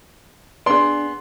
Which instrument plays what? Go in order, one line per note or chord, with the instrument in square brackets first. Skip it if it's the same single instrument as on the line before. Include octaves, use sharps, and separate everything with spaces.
[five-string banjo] B3 G#4 [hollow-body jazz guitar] D4 D5 [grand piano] C6